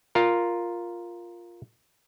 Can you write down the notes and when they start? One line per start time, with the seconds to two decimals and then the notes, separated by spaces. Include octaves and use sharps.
0.15 F4 A#4